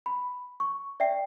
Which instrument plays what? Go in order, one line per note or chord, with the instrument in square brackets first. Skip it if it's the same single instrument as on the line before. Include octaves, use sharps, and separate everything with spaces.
[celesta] B5
C#6
D5 E5 G5 C7